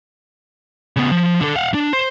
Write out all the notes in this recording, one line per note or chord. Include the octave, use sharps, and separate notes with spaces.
C#3 B3
F3
D3 A4
F5 F#5
D4
C5